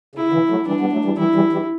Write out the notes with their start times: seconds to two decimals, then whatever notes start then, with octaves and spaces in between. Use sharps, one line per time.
0.15 C#3 E4
0.28 D3
0.33 C#3 E3
0.49 F#3 A3
0.67 E3 G3 D4
0.80 G3 B3
0.92 F#3 A3
1.05 E3 G3
1.18 E3 G3 E4
1.35 E3 G3
1.52 E3 G3